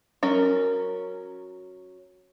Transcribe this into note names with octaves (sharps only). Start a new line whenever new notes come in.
F#3 C#4 A#4